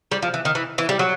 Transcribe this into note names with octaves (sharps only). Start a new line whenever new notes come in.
G3
F3
E3
D#3
E3
E3
G3
F#3